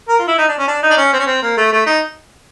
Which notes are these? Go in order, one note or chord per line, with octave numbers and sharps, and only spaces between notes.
A#4
F4
E4
D#4
D4
C#4
D4
D#4
D4
C#4
C4
C#4
C4
A#3
A3
A3
D#4